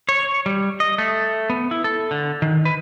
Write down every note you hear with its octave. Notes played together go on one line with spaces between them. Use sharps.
C#5
G3
D#5
A3
B3
E4
A4
D3
D#3
B4